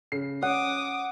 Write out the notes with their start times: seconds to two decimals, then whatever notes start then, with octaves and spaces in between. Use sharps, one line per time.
0.12 C#3 C7
0.42 C#4 F#5 D6 D#6